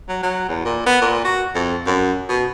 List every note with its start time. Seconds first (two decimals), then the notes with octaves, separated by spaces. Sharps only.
0.09 F#3
0.23 F#3
0.49 E2
0.65 A#2
0.86 B3
1.02 A#2
1.25 F#4
1.55 F2
1.86 F#2
2.29 B2